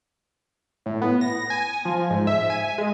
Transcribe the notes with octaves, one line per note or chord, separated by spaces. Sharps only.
A2
B3
A#6
G#5
F3
G#2
E5
G#5
G#3